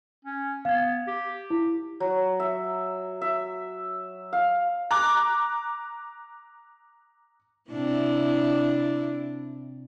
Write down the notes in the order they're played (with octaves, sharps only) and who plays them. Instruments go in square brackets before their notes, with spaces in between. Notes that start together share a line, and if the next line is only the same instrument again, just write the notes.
[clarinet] C#4
[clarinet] B3 [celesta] F5 G#6
[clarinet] G4
[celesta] E4
[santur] F#3
E5
E5
F5
[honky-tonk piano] A#5 D6 F#6
[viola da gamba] C3 D4 E4